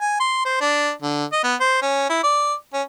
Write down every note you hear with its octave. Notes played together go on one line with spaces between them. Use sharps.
G#5
C6
C5
D4
D3
D#5
B3
C5
C#4
E4
D5
C#4